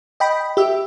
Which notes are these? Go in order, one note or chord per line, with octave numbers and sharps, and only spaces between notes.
D#5 G5 B5
G4 E5